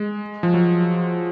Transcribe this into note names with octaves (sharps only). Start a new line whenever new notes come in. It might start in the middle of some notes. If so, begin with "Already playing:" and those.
Already playing: G#3
F3
F#3